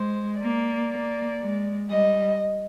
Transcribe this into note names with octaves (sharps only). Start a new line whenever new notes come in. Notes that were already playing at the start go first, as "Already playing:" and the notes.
Already playing: G#3 C5
A#3 D5
A#3
G#3
G3 D#5